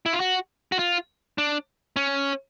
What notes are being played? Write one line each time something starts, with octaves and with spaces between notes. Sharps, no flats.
E4
F4
F#4
F#4
F4
D4
C#4